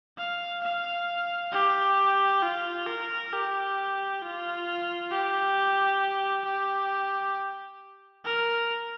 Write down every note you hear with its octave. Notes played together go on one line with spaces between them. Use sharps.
F5
F5
G4
F4
A#4
G4
F4
G4
G4
A#4